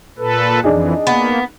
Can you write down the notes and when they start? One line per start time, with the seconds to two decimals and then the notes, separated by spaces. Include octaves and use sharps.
0.19 A#2 A4 B4
0.64 F2 E3 D4 D#4 G#4
1.07 A#3 B3